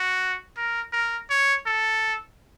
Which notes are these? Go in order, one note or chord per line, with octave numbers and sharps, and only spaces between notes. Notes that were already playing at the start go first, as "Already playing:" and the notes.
Already playing: F#4
A#4
A#4
C#5
A4